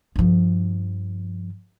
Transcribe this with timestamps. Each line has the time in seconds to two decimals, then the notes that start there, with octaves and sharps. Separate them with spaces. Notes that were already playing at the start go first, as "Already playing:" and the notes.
0.16 G2 F3